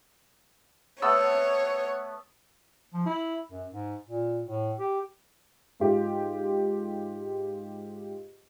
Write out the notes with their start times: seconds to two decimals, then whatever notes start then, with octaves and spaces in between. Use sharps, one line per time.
1.02 A3 B3 C#5 E6
2.94 F3
3.06 E4
3.52 F#2
3.71 G#2
4.07 A#2
4.45 A2
4.79 G4
5.80 G#2 F4 G4